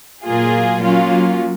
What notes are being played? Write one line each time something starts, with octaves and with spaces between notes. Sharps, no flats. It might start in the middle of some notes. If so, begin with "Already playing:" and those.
A#2 F#3 A#3 F4 G#4
F#3 A#3 C#4 F4